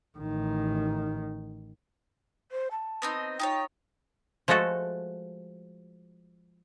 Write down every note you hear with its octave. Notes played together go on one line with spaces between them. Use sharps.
A1 D#3
C5
A5
B3 C4 D#4
D#4 F4 C#5 G5
F3 G#3 A3 F#4 A4